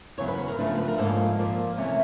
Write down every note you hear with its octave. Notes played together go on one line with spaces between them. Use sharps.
E2 C#3 F#3 B3 C#5
B4
B4
A#4
C#3 F3 A3 D4 B4
B4
A#4
G#2 F3 A#3 C#4 A4
A#2 F3 A#3
C3 E3 A3 C#4